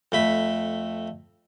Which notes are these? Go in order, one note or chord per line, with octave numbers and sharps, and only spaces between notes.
F2 A3 B5